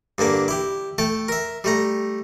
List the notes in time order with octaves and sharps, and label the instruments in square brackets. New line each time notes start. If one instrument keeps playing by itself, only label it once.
[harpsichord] G2 D3 A#3 D4
E4 G4
A3 G5 A5
A#4 E5
G3 A3 A#5